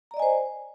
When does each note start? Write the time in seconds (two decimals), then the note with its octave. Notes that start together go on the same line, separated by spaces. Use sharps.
0.11 A#5
0.14 D5
0.17 D#5
0.19 G#5
0.22 C5